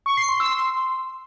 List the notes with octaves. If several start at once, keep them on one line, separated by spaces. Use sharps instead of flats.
C#6
C7
C6
E6
C6